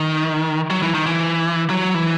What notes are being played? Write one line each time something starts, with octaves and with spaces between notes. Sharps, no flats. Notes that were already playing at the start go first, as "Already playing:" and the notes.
Already playing: D#3
F#3
E3
D#3
E3
F#3
E3